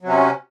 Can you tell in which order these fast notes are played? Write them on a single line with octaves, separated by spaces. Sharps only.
F#3 C3 C#4